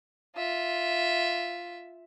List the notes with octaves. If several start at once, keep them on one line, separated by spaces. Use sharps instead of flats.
F4 E5